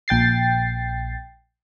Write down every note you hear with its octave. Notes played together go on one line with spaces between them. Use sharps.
A#1 G5 A6 C7